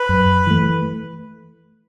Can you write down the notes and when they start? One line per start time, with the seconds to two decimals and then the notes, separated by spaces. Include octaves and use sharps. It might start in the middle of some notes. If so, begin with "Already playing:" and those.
Already playing: B4
0.09 F#2
0.47 E3 A3